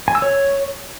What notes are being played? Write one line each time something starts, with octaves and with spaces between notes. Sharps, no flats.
G#5
E6
C#5